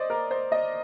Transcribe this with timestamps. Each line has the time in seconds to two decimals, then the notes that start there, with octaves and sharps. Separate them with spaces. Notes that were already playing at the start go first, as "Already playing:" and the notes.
Already playing: C5 D5 D#5
0.10 A#4
0.31 C5
0.52 D#5